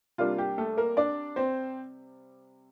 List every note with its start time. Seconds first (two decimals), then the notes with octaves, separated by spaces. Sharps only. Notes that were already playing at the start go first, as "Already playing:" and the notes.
0.18 C3 G3 A#3 D4 F4
0.38 G4
0.58 A3 A4
0.77 A#3 A#4
0.97 D4 D5
1.36 C4 C5